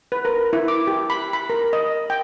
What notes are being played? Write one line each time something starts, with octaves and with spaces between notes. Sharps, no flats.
B4
A#4
E4
D6
G4
B5
B5
A#4
D#5
G5